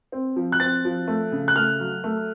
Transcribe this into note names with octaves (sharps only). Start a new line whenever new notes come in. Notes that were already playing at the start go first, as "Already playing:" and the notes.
C4
F3
F#6
C4 A6
F3
A3
C#3
F#6
A3 F6
F#3
A3